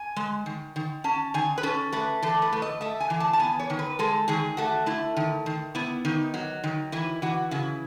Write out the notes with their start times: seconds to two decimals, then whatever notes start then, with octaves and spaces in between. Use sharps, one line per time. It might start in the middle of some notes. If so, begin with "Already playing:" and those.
Already playing: G#5
0.16 G#3
0.46 D#3
0.76 D#3
1.04 C#4 A5
1.34 D#3 G#5
1.58 B4
1.63 C#4 A4
1.93 A3 B4
2.22 E3 A4
2.42 B4
2.52 A3
2.62 D#5
2.81 A3 E5
3.00 G#5
3.10 E3
3.20 A5
3.33 A5
3.39 B3 G#5
3.59 C#5
3.70 D#3
3.79 B4
3.99 G#3 A4
4.28 D#3 G#4
4.57 A3 F#4
4.86 A3 E4
5.17 D#3
5.46 D#3
5.75 B3 E4
6.05 D#3 D#4
6.34 F#3
6.64 D#3
6.92 E3 E4
7.22 E3 F#4
7.51 C#3 E4